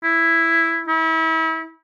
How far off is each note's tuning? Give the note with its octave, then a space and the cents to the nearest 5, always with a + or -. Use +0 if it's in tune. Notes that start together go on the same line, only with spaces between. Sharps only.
E4 +5
E4 -35